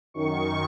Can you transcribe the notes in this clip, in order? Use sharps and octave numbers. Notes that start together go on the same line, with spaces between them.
F#2 D#3 C#6